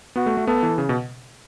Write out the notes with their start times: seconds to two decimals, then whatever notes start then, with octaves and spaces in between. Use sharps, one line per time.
0.16 B3 F#4
0.26 A3
0.37 A3
0.47 B3 A4
0.63 E3
0.78 C#3
0.89 B2